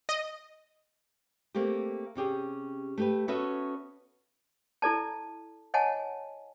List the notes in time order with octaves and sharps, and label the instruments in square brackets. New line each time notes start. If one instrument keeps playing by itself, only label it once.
[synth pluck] D#5
[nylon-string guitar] A3 A#3 C4 G4
C3 C#4 G4 G#4
A3 G4 B4
B3 C#4 F#4 A4 B4 E5
[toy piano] E4 A4 D5 A5
C#5 D#5 F#5 G#5 A5